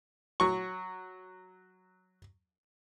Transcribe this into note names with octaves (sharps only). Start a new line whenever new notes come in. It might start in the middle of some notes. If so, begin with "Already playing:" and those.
F#3 C#6